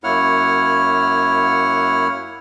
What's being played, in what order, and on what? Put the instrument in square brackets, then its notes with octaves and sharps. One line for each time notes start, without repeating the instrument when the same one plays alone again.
[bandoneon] F#2 A#3 E4 C#5 F#5 F6